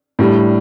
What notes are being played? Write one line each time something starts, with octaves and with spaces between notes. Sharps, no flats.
A2 G3 D4